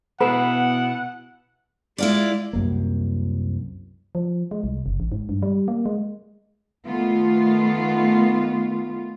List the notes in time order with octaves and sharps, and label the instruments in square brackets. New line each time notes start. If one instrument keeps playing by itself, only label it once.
[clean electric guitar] B2 E4 [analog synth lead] B3 [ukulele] B4 [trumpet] F#5
[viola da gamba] G#3 [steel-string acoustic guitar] E4 F4 D5
[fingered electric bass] C2 F#2 A#3
[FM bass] F3
G#3
C2
F#1
A1
G#2
G2
G3
A#3
G#3
[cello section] D#3 A3 B3 F4